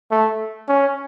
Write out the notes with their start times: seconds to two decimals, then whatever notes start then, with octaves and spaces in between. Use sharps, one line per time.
0.11 A3
0.68 C#4